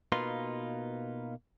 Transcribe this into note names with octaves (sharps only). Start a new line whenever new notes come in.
B2 A#3 D#4 F4 B4 C6